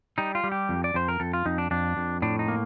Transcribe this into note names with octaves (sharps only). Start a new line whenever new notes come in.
G3 D#4
F4
G3
G4
F2
D5
F2 C5
A#4
F2 A4
F4
F2 D#4
D4
F2 D4
F2
A2 D4
D#4
A#3